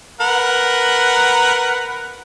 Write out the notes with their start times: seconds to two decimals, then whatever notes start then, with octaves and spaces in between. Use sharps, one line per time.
0.21 A#4 B4 F#5